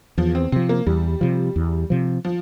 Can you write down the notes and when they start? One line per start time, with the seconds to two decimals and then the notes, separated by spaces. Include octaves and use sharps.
0.18 E2 F3
0.35 C4
0.52 C3 F3 C4
0.69 A#3
0.87 E2 G3
1.21 C3 F3
1.56 E2
1.90 C3 F3
2.25 F3